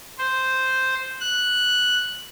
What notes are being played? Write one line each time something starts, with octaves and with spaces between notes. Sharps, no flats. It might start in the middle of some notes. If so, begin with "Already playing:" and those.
C5
F#6